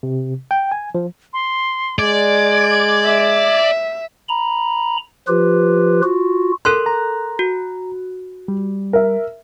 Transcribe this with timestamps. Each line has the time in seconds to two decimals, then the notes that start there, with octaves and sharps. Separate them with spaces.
0.03 C3
0.51 G5
0.72 G#5
0.95 F3
1.33 C6
1.99 G#3 D5 G#6
3.05 E5
4.29 A#5 B5
5.27 F3 F4 G4 B4
6.03 F4 F#4
6.65 A4 A#4 C6 F#6
6.86 A#5
7.39 F#4
8.48 G3
8.93 A#4 E5